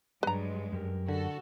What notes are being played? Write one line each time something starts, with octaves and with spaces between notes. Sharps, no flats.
G2 F#3 G#3 B4 A#5
F#2 G4 A#4
D3 F#4 A4